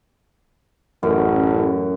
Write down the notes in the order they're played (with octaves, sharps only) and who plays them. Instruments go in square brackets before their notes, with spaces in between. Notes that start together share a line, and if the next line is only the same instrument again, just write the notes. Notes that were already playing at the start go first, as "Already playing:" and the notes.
[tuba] A1 [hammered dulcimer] F#2